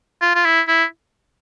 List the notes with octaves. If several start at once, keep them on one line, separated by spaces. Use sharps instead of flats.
F4
F4
E4
E4